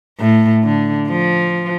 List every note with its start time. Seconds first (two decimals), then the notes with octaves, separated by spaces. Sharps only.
0.20 A2
0.63 D3
1.08 F3